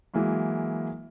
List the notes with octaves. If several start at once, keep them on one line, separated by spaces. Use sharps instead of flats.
E3 F#3 G#3 A#3 E4